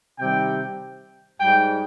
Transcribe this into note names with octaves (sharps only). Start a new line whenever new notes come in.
C3 D#3 G3 G5
G#2 G3 G5